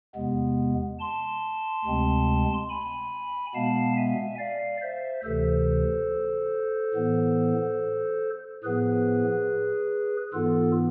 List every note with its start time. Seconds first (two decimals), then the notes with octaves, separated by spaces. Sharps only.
0.15 E2 C3 G#3 B3
0.99 A5 C6
1.85 D2 C3 G#3 C4
2.69 G#5 B5
3.55 B2 G#3 B3 F5 A5
3.97 E5 G#5
4.39 D5 F5
4.82 C5 E5
5.24 D2 C3 E3 A4 C5
6.94 A2 E3 B3
8.63 A2 F3 B3 G#4 B4
10.33 G#2 E3 B3 F4 A4